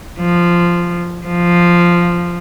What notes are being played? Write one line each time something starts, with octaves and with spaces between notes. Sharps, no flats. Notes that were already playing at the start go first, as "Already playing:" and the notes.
F3
F3